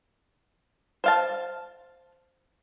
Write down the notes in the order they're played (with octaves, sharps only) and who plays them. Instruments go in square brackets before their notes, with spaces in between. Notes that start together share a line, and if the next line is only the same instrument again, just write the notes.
[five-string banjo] C5 F5 A5